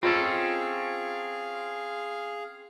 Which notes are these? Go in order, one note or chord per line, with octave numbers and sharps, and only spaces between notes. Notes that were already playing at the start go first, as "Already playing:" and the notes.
C4 C#4 F4 G#4 A4 D#5 F5